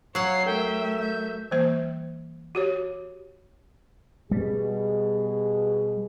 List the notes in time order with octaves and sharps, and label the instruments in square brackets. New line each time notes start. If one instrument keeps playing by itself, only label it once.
[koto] F#3 F#5 [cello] C#5 F5 [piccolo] C7
[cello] A3 E5 [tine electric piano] A4 A#4 [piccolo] G5
[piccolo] G6
[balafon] E3 G3 A#3 C5
F#4 G4 C#5
[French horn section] B2 G#4 [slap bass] G3